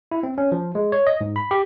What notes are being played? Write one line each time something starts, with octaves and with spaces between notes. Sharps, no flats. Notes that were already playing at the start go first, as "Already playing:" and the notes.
E4
C4
C#4
F3
G#3
C#5
D#5
G#2
B5
G4